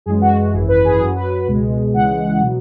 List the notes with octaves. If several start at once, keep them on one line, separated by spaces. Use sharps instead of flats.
F#2 E3 G#3 G#4
F#4
F#4
G#1 F#2 E3 G#4
B4
G#4
F#2 F#3 G#4
B4
C#2 B2 G#3
C#2 C#3 E3 G#3 F#5
B2 F#3